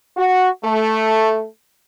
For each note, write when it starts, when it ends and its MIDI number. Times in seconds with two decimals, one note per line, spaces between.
0.17 0.49 66
0.64 1.47 57